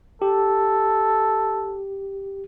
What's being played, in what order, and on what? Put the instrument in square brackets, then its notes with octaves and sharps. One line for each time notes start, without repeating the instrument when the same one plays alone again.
[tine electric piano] G4 [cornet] A4